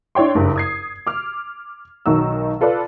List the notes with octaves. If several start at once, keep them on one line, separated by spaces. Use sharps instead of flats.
D4 E4 C#5 G5 C6
F#1 G2
D#6 G#6 C7
D6 F6
B1 D#3 F#3 D#4 E6
F4 A4 B4 D5